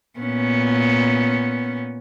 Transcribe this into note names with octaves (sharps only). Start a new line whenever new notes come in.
A#2 B3 C#4